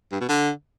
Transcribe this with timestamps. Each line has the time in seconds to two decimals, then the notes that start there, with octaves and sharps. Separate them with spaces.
0.12 G2
0.21 B2
0.29 D3